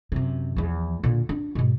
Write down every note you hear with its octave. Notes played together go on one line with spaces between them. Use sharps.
F#2 C3
E2 F3
A#2 D3
D4
G#2 B2